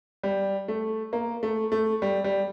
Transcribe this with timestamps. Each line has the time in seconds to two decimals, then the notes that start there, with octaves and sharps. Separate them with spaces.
0.23 G3
0.68 A3
1.13 A#3
1.43 A3
1.72 A3
2.02 G3
2.24 G3